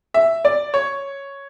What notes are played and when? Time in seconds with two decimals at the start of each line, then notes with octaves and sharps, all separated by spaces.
0.14 E5
0.45 D5
0.74 C#5